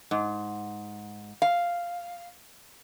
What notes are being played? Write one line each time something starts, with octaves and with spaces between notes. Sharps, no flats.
G#2
F5